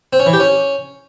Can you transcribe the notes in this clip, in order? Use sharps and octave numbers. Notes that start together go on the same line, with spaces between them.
C4
C#4
E3
G4
C#4